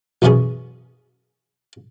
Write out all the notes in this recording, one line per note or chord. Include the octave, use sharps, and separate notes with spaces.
A1 F#2 B2 B3 C#4 G#4